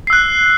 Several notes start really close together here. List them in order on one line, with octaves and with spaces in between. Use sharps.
C7 E6 F#6